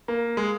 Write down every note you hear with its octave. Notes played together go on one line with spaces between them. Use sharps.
A#3
G#3